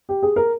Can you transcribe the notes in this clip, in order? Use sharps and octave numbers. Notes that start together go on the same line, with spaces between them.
G4
G#4
A#4